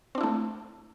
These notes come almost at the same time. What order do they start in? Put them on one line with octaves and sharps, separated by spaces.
C4 D4 E4 A3